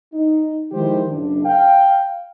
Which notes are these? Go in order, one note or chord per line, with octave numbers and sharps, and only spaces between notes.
D#4
D#3 F3 G#3 E4 G4 C5
F#1 D4
F5 G5